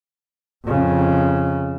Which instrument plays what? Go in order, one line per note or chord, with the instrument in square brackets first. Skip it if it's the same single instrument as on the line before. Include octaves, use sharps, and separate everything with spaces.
[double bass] F2 C#3